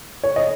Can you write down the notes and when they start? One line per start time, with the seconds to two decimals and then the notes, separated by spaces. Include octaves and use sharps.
0.24 C#5
0.36 D#5